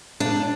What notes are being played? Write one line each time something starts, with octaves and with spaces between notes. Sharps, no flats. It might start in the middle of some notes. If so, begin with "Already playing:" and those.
D4